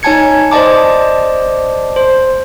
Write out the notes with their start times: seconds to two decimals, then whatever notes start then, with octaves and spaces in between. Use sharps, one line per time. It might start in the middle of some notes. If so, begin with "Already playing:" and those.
0.03 D#4 C#5 G#5 A5 G#6 C#7
0.51 C5 D5 D#5 A5 D6
1.96 C5